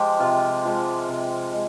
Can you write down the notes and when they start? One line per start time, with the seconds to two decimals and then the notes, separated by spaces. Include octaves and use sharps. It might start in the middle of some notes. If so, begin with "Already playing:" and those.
Already playing: F3 G#3 G4
0.20 C3 F4
0.65 F3 G#3
1.09 C3
1.53 G#3